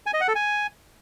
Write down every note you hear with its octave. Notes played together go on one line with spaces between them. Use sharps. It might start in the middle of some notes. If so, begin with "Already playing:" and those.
G#5
D#5
F#5
A4
G#5